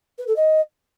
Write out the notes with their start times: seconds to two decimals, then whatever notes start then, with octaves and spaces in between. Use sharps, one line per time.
0.18 B4
0.27 A4
0.36 D#5